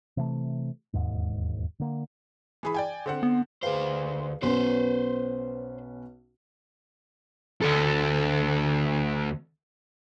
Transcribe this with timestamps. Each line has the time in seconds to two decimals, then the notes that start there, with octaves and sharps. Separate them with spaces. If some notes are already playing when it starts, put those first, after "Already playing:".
0.17 C3 E3 A3
0.94 E1 D#2 G#2
1.80 D3 A#3
2.63 E3 G#4 B5
2.74 D5 G5 G#5
3.06 D3 C4 F#5
3.23 B3
3.63 D2 G#4 B4 C5 F5
4.43 B1 B3 C#4 B4 C5
7.61 D2 A4